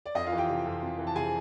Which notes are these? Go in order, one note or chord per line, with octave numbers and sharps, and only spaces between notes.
D5
F2 D#5
F4 F5
E3
G4 G5
C3
F2
F2
E3
A5
C3 G#4 G#5